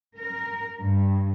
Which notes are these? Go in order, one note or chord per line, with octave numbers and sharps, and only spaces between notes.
A#4
G2